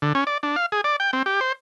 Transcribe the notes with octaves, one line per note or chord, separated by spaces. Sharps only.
D3
C#4
D5
D4
F5
G#4
D5
G5
C4
G4
C5